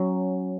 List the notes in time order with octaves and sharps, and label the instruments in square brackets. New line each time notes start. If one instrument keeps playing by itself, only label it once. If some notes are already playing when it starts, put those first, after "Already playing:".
Already playing: [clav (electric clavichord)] F#3 [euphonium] C#4